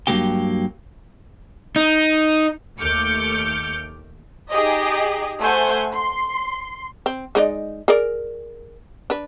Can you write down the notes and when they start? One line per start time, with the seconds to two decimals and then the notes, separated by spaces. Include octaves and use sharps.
0.07 G2 D#3 F#3 A#3 G4 G5
1.76 D#4
2.80 D#2 A3 D6 F6 G6 C#7
4.51 D#4 G4 G#4 D#5
5.40 A3 C5 F#5 G#5 G6
5.93 C6
7.06 C4
7.35 G#3 D#4 D5
7.88 G#4 A#4 D5
9.10 D4 B4